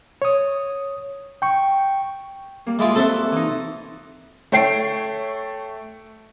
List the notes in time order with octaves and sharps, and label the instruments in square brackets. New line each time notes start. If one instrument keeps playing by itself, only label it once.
[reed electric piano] C#5 D#6
G5 C#6
[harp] G3 A#3
[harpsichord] G#3 E4 F4 [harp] D5
[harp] C3 F#4 [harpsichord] A4 C5 E5
[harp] E3 D#4
[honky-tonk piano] A3 C#5 G5 C7 D7